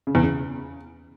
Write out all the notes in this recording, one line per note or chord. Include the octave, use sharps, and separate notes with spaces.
C#3
E2
C#3